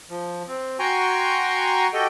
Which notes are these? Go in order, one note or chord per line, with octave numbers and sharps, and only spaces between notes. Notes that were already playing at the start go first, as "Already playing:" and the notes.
F3
C4
F#4 G5 G#5 A#5 C6 C#6
F#4 G4 A4 D#5 G5